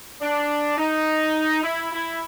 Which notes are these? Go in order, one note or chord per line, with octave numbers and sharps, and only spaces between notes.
D4
D#4
E4
E4